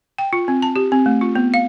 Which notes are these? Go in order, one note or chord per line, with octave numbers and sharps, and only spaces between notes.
G5
F4
C4
A5
G4
C4
A3
F4
B3
F5